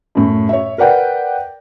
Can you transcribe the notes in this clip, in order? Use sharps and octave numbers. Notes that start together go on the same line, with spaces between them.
F#2 A2
C#5 E5
A#4 B4 D5 F#5 G5